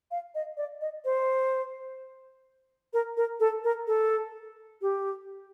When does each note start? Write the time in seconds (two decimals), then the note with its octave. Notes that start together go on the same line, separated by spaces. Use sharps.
0.11 F5
0.35 D#5
0.57 D5
0.81 D#5
1.05 C5
2.93 A#4
3.17 A#4
3.40 A4
3.64 A#4
3.87 A4
4.82 G4